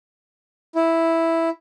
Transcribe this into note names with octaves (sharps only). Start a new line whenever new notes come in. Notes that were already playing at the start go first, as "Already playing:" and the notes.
E4